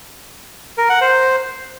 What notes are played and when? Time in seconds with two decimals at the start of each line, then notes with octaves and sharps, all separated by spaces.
0.78 A#4
0.89 F#5
1.01 C5